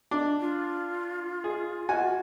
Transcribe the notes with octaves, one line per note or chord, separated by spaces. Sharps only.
D4
F4
G#4
F#4 G#5